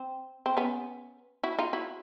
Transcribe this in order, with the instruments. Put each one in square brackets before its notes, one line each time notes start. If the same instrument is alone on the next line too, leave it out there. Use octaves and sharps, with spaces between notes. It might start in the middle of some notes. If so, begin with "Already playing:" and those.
Already playing: [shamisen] C4
C4
B3 C#4
E4 F#4
D#4 F4
E4 F#4